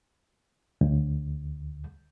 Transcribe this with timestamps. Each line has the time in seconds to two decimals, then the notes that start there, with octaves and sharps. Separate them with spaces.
0.81 D2